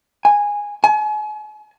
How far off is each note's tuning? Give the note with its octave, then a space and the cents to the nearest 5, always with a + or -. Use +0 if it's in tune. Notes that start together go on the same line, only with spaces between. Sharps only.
G#5 -10
G#5 +40